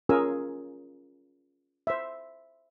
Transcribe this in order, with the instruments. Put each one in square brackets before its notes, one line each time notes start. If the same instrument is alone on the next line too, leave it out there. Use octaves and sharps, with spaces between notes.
[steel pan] C#4 F4 G#4 A#4 G#5 E6
C5 E5